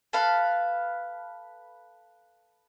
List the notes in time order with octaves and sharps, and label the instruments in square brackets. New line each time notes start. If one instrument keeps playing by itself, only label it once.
[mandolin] A4 B4 F5